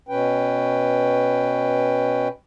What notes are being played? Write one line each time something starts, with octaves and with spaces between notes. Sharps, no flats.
B2 C#4 B4 G5